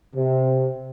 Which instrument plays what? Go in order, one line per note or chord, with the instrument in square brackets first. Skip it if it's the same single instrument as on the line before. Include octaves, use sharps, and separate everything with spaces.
[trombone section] C3